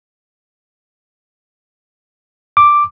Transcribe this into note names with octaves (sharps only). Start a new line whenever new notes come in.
D6